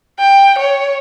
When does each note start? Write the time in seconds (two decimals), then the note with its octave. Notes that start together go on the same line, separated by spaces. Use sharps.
0.19 G5
0.58 C#5